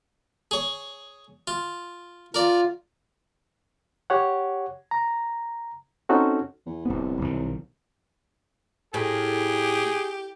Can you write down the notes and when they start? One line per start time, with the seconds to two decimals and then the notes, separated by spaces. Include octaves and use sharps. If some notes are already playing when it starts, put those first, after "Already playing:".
0.51 G#4 C#5
1.47 F4
2.34 F4 A#4 D5
4.10 G4 C#5 F#5
4.91 A#5
6.09 C4 C#4 D#4 F#4 A4
6.66 E2
6.85 D1 C2 B3
7.21 B1 D#3
8.94 A2 G4 G#4